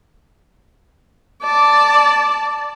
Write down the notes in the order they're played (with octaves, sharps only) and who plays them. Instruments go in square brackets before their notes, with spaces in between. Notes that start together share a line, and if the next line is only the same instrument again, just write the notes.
[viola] D5 A5